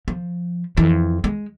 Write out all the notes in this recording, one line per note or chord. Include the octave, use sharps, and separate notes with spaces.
F3
F2 E3
G#3